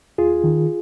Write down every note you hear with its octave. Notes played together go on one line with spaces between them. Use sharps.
D#2 F4 G#4
D#3